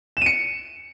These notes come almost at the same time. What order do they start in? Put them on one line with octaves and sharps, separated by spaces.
E7 D#7 C#7